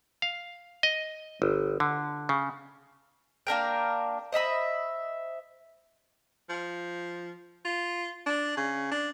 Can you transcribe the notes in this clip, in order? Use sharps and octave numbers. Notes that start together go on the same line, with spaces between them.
F5
D#5
G1
D3
C#3
A#3 D4 A#4 G5
C5 D#5 E5 B5
F3
F4
D4
C#3
D4